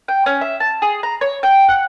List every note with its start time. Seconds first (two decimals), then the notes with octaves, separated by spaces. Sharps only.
0.08 G5
0.26 C#4
0.41 E5
0.60 A5
0.82 G#4
1.03 A#5
1.21 C#5
1.43 G5
1.68 F#5